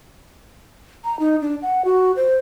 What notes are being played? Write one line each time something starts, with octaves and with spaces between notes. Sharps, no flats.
A#5
D#4
D4
F#5
F#4
C5